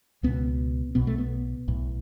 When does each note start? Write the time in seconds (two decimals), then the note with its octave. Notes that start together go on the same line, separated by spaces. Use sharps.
0.23 C#2 B2 B3
0.95 B1 B2 B3
1.07 A3
1.18 B3
1.68 B1 A2